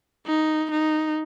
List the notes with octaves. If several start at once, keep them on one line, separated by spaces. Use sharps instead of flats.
D#4
D#4